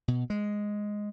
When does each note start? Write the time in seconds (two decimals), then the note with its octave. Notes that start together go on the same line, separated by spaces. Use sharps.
0.08 B2
0.30 G#3